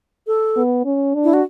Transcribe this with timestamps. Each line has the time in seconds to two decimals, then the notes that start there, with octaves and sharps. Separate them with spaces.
0.27 A4
0.56 B3
0.85 C#4
1.14 D4
1.24 E4
1.33 F#4